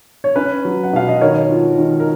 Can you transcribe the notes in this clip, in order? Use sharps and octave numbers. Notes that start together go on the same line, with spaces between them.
C#5
C#4 B4
F#3
F#5
B2 F5
D#5
D#3 A#4 C#5
F4
D#3
A#4